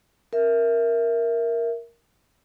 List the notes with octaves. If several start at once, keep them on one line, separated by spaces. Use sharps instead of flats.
A#4 E5